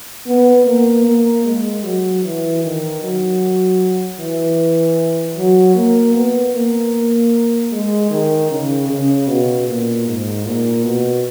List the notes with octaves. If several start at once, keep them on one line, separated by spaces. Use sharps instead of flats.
B3
A#3
A#3
G#3
F#3
E3
D#3
F#3
E3
F#3
A#3
B3
A#3
G#3
D#3
C#3
C#3
B2
A#2
G#2
A#2
B2